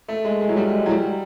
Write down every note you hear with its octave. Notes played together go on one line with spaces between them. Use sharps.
A3
G#3
G#3
F#3
G3
G#3
F#3
G3